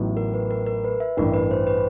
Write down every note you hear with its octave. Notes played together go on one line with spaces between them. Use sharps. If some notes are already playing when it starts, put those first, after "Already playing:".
Already playing: A1 A2 F#3 B3 D#4
A#4
B4
A#4
A#4
B4
E5
A1 G2 E3 A#4
B4
C5
B4